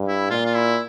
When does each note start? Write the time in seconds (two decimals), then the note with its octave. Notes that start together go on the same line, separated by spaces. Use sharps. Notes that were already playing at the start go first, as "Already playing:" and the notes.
Already playing: G2
0.08 E4
0.30 A#2 F4
0.45 F4
0.55 E4